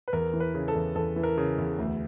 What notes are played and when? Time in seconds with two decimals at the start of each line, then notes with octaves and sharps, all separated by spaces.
0.08 B4
0.13 E2 A#4
0.33 E3
0.40 B4
0.55 C#3
0.68 A4
0.75 E2
0.95 E2 A4
1.16 E3
1.23 A#4
1.38 C#3
1.58 E2
1.78 D2